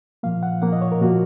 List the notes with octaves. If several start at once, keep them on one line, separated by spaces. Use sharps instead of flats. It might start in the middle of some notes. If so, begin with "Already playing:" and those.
A#2 F3 A#3 F5
F#5
A#2 F3 A#3 F#5
D#5
C#5
A#4
A#2 F3 A#3 F#4